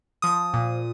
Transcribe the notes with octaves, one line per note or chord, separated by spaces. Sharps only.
F3 D#6
A#2